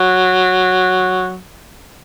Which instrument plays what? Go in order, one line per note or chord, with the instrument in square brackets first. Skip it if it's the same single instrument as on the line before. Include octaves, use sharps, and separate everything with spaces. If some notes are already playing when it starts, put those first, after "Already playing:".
Already playing: [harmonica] F#3